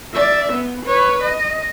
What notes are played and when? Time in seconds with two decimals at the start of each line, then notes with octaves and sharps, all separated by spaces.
0.15 D5 E5
0.52 B3
0.86 B4 C#5
1.23 D#5